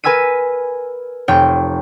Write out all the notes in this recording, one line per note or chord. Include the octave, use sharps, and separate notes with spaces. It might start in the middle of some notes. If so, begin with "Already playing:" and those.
A#4 B4 G#5 E6 B6 D#7
F1 C#5 G5 C#6